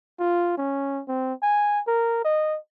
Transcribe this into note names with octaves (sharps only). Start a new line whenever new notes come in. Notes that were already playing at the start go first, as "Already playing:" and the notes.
F4
C#4
C4
G#5
A#4
D#5